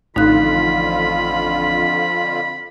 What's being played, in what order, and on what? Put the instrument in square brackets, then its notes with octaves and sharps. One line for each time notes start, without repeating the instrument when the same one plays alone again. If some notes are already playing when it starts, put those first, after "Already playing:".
[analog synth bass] A1 [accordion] F2 D3 F4 [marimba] D#4 F#6 [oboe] B5